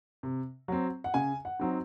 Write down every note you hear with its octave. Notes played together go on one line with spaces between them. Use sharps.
C3
F#3 C4
F#5
C#3 G#5
F#5
F#3 C4 D#4